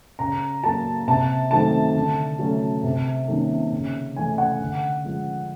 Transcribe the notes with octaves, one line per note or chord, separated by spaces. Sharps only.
C#3 A#5
F#3 A#3 A5
C3 A5
D#3 F#3 A3 C4 A5
D3
F#3 A3 C#4
C3
D#3 G3 A#3 C#4
C#3
E3 A3 C#4 G#5
F#5
D3
F3 G#3